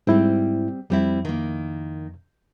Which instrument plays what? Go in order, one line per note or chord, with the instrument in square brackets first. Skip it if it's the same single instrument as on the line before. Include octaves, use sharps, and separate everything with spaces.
[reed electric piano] G#2 E4 [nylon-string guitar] G3 C4
[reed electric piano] F2 [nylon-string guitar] G3 C4 E4
[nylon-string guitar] D#3 A#3